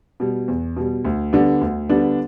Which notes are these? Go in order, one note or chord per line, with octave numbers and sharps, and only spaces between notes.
B2 G3
E2
B2 G3
D2
D3 G3 B3 D4
D2
D3 G3 B3 D4